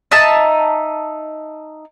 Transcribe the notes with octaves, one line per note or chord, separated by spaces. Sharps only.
D#4 E5 A5